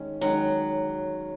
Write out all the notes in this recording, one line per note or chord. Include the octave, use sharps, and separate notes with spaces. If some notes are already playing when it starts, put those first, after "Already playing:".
Already playing: D#3 G#3 C#4
D#3 F#3 G#3 C#4